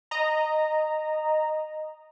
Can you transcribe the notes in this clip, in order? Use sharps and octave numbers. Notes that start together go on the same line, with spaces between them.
D#5 A#5